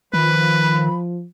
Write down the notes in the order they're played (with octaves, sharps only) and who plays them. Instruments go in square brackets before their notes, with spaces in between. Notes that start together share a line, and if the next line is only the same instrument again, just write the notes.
[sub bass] D#3 [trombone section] F3 [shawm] B4 [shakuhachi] B5